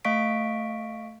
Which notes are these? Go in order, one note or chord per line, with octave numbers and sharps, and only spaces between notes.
A3 D#5 F5 C#6 B6 D7